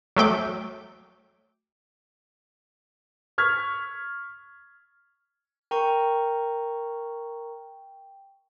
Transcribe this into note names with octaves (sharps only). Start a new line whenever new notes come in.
F#3 A3 G5 D6
C#6 F6 G#6 B6
A#4 G5 A#5 C#6